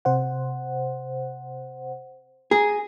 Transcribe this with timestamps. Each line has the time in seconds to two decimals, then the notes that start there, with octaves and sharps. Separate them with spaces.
0.05 C3 C5 F#5
2.51 G#4 A#5